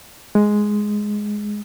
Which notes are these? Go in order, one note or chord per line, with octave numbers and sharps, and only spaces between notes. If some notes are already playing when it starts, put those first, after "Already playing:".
G#3